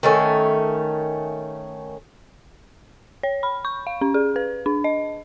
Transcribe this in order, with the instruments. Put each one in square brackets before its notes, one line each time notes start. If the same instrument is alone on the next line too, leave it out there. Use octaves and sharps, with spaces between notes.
[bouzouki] D#3 A3 C#4
[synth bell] C#5
B5
C#6
F5
C#4
G#4
B4
D4
D#5